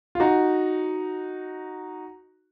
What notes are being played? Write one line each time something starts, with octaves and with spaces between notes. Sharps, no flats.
F4
D#4 F#4